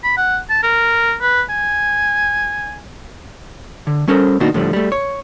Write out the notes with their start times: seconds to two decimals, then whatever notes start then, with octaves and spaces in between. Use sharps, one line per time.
0.04 B5
0.17 F#5
0.50 A5
0.63 A#4
1.22 B4
1.50 G#5
3.87 D3
4.08 G3 C#4 A4 A#4 C5
4.40 B2 D#3 A#3 D4 D#4 F#4
4.54 A2 D3 F3 G3
4.73 G3 A3
4.92 C#5